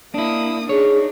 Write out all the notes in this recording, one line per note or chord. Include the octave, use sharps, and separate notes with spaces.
A#3 D4 E4 D#6
D4 D#4 G#4 C#5